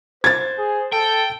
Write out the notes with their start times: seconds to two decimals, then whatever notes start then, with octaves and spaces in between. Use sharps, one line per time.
0.24 C5 G#6 A6
0.58 G#4
0.93 A4 G5